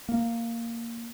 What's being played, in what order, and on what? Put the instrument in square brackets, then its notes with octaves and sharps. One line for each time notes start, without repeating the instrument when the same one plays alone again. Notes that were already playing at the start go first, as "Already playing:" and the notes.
[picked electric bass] A#3